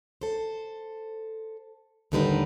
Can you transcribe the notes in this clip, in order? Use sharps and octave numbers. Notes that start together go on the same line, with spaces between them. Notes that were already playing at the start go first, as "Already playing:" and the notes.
A4 C5
D#2 A2 D3 G3 D#4 B4